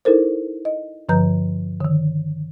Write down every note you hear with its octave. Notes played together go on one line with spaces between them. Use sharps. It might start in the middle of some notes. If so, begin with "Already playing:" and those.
D#4 E4 A4 A#4 C5
D#5
G2 D3 F3 B4 A#5 G6
D3 D#3